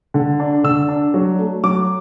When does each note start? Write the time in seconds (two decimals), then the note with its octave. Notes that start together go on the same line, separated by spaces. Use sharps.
0.14 D3
0.40 D4
0.64 D3 E6
0.89 D4
1.14 F#3
1.39 A3
1.64 F#3 D6